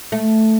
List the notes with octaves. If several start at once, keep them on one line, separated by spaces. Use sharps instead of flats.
A3